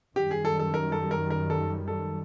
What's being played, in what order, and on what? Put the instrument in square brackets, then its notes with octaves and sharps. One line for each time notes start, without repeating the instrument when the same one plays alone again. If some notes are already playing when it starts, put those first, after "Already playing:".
[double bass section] F#2 D#3 G3 [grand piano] G4
[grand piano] G#4
A4
A4
A#4
A4
A#4
A#4
A4
A4